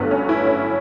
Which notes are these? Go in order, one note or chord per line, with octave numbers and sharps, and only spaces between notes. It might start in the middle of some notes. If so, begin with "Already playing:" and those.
Already playing: G1 G2 F#3 A3 B3
C#4
E4
C#4